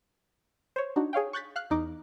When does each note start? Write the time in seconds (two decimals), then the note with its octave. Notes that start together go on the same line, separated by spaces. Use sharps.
0.76 C5 C#5
0.96 D4 D#4 F#4
1.13 G#4 C#5 F5 G5
1.33 C#6 F#6 G6 A6 B6
1.56 F5 F6 F#6
1.70 E2 D#4 D6